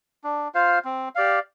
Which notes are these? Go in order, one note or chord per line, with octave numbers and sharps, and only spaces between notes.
D4
F4 C5 F5
C4
G4 D5 F5